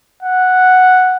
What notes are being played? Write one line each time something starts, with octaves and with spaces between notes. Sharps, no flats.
F#5